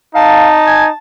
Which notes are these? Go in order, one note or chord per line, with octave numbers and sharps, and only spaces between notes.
D#4 F5 A5
G#5